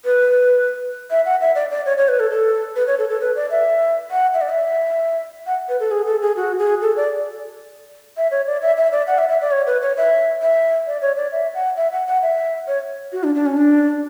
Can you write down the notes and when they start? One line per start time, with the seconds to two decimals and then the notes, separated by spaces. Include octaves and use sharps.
0.05 B4
1.11 E5
1.25 F#5
1.41 E5
1.55 D5
1.71 D5
1.86 C#5
1.97 C#5
2.08 B4
2.20 A4
2.31 A4
2.76 B4
2.87 C#5
2.98 A4
3.09 A4
3.21 B4
3.36 D5
3.51 E5
4.11 F#5
4.34 E5
4.41 D5
4.49 E5
5.46 F#5
5.69 B4
5.80 A4
5.91 G#4
6.06 A4
6.22 G#4
6.36 F#4
6.59 G#4
6.82 A4
6.97 D5
8.17 E5
8.31 C#5
8.47 D5
8.62 E5
8.77 E5
8.92 D5
9.07 F#5
9.18 E5
9.29 E5
9.41 D5
9.51 C#5
9.66 B4
9.82 C#5
9.97 E5
10.42 E5
10.87 D5
11.02 C#5
11.16 D5
11.32 E5
11.54 F#5
11.77 E5
11.92 F#5
12.07 F#5
12.22 E5
12.67 C#5
13.12 F#4
13.24 D4
13.35 D4
13.46 C#4
13.57 D4